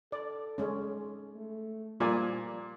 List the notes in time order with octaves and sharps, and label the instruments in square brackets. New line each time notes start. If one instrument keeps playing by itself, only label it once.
[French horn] A4 [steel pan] D5
[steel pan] G#3 C#4
[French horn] A3
[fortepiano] A#2 [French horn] F3 [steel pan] G3 D5 G#5